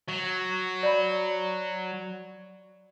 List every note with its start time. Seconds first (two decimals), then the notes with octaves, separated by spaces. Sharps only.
0.09 F#3
0.83 D5 B5